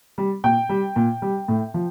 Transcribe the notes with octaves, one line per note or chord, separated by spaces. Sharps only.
G3
A#2 G5
G3
A#2
G3
A2
F3